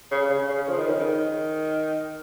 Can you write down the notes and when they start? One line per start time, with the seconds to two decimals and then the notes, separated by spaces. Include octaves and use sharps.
0.11 C#3
0.30 C#3
0.48 C#3
0.68 F3
0.78 D#3
0.89 C#3
0.99 D#3